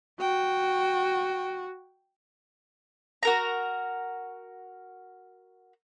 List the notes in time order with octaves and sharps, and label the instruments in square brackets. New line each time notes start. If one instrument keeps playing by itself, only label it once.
[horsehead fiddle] F#4 [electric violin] G5
[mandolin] F#4 A#4 A#5